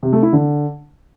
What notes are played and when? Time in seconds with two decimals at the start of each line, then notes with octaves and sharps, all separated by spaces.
0.03 C3
0.13 A3
0.23 E4
0.33 D3